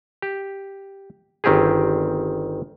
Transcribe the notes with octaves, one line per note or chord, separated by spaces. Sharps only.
G4
G1 D#3 C4 G4 G#4